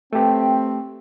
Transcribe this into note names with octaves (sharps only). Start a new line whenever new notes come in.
A3 C4 G4 B4 C5 G5